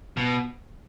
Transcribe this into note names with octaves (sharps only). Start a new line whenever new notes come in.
B2